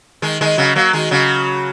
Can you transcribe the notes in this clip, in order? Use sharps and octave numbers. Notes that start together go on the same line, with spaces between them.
D#3 G#3
D#3 G#3
C#3 F#3
F#3 A#3
D#3 G#3
C#3 F#3